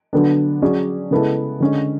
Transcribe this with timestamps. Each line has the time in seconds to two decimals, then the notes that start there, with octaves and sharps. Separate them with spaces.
0.13 D3 F#3 B3 D4 A4
0.62 F#3 C#4 G#4 D5
1.11 C#3 G#3 B3 E4 A4
1.60 D3 G#3 C#4